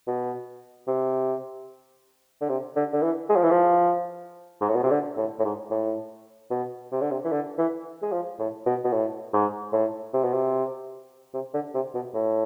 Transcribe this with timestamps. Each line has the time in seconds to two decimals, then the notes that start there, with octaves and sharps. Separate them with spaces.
0.07 B2
0.87 C3
2.41 D3
2.49 C3
2.76 D3
2.93 D3
3.03 E3
3.30 G#3
3.36 F3
3.43 E3
3.51 F3
4.61 G#2
4.69 A2
4.75 B2
4.83 C3
4.91 D3
5.17 A2
5.39 A2
5.44 G#2
5.71 A2
6.51 B2
6.92 C3
7.01 D3
7.11 C3
7.24 E3
7.32 D3
7.58 E3
8.02 G#3
8.12 F3
8.39 A2
8.66 B2
8.84 B2
8.93 A2
9.33 G#2
9.73 A2
10.13 C3
10.24 B2
10.34 C3
11.34 C3
11.54 D3
11.75 C3
11.94 B2
12.14 A2